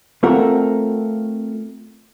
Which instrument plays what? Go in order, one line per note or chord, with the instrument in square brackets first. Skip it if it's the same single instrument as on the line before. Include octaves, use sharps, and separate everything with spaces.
[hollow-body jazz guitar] A3 C4 F4 A4 A#4 F#5